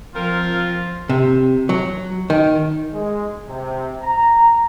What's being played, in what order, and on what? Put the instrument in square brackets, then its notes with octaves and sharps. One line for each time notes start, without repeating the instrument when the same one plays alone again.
[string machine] F3 [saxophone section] C4 A#4 [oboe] F4
[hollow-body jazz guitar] C3
F#3
D#3
[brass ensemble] G#3
C3
A#5